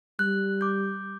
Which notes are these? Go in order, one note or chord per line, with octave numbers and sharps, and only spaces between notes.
G3 F#6
D6 G6